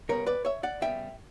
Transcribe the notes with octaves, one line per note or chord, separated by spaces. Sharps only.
C#3 G3 B3 A#4 C#5
B4 D5
C#5 E5
D5 F#5
C#3 G3 B3 E5 G5